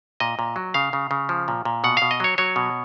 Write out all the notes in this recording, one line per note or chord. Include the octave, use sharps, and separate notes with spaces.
A#2 D#5
A#2
F#3
C#3 F5
C#3
C#3
F3
A#2
A#2
B2 F#5
B2 F5
D#5
F#3 C#5
F#3 C#5
B2